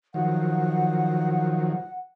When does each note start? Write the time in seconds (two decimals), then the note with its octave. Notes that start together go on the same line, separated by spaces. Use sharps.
0.14 D#3 F3 F#3 F#5